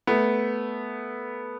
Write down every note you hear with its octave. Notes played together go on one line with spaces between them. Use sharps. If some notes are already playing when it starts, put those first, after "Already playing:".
A3 B3